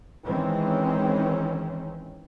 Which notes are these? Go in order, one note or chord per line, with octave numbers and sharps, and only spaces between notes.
D#3 E3 G#3 C4 C#4